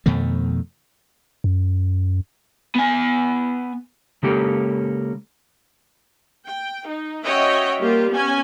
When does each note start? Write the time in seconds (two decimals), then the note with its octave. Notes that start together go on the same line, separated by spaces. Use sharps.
0.06 F2 B2 D#3 A3
1.44 F#2
2.76 B3 G#5
4.23 C#3 G#3 A#3 C#4 G4 A4
6.45 G5
6.84 D#4
7.25 C#4 F#4 C#5 D#5 E5 G5
7.80 G3 A#3 F4 G4
8.10 B3 C#4 G#5